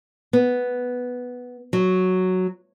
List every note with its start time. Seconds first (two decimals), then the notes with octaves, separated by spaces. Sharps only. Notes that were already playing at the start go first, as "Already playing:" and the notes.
0.33 B3
1.73 F#3